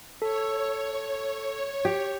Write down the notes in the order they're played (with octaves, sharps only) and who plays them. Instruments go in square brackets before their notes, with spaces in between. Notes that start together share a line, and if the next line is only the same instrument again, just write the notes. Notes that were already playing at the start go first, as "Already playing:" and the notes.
[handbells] A4 [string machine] C#5
[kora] G4